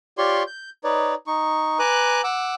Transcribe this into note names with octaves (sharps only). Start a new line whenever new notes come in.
F4 G4 C#5 D5 C6 C#6
G6
D#4 B4 C#5 D5
D#4 C#6
B4 G#5 A#5 D6 F#6
F#5 D6 E6